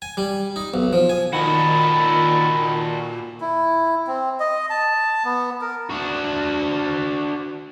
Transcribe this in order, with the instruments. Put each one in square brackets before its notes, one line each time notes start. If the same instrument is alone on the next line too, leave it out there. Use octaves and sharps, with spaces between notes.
[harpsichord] G#5
G3
D#4
B1
F3
G#5
[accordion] A#2 [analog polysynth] D#3 [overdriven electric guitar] F#4 A4 [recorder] B5
[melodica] E4
C4
D#5
A5
B3
A#4
[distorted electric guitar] D4 F#4